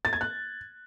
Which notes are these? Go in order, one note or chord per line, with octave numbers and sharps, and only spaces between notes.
A6
G#6
F#6